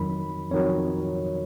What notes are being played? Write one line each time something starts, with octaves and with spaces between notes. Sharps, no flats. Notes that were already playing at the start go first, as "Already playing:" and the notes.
Already playing: F2 D#3 F#3 B5
F2 D#3 F#3 C#5